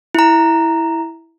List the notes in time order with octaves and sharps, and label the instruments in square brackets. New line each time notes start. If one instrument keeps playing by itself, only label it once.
[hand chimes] E4 A#5